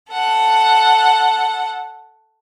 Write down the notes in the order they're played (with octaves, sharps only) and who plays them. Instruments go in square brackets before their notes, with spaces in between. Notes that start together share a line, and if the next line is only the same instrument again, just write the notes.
[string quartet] A4 F#5